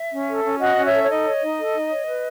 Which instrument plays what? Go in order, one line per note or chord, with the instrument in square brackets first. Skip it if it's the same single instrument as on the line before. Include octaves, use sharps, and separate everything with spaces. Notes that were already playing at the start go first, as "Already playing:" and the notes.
Already playing: [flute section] E5
C#4
A4
C#4
F#4 D#5 F#5
C#4
C#5 E5
A4
C#5
D#4 D#5
C#5
D#4
A4
D#4
C#5
B4